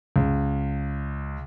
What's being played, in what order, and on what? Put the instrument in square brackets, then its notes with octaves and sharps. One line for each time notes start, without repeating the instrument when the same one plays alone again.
[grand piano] C#2